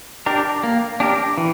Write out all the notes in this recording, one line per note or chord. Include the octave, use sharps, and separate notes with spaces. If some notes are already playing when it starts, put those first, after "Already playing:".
D4 G4 A#4
A#3
D4 G4 A#4
E3